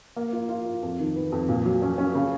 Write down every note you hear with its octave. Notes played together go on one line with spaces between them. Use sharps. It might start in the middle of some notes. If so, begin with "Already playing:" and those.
A#3
F4
F4
F4
F2
D#3
B3
F2
A#2
F#3
C#4
C#4
C#3